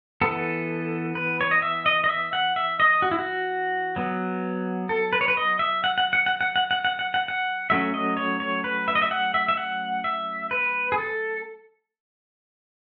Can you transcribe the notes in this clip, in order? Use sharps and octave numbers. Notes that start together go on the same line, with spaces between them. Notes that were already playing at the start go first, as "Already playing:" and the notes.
E3 B3 A4
B4
C#5
D#5
E5
D#5
D#5
E5
F#5
E5
D#5
F#4
E4
F#4
F#3 B3
A4
B4
C#5
B4
D#5
E5
F#5
F#5
F#5
F#5
F#5
F#5
F#5
F#5
F#5
F#5
F#5
F#3 A3 C#4 E5
D#5
C#5
C#5
B4
E5
D#5
E5
F#5
E5
E5
F#5
E5
B4
G#4
A4